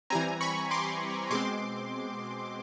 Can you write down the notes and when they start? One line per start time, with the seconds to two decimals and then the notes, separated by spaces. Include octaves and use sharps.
0.10 E3 G3 C4 G#5 A#5
0.41 B5 C#6
0.71 C6 D6
1.30 B2 G#3 C4 C6 D6